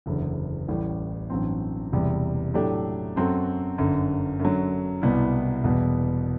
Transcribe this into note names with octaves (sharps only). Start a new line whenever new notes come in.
F#1 E2 D3 F#3
A1 A2 G3
A1 G2 F#3 C4
E1 E2 C3 G3
A2 F#3 A3 D4 G4
F#2 F#3 C4 F#4 A4
G1 F#2 D3
F#2 D3 F#3
C2 B2 G3 B3 E4
E1 E2 B2 G3 B3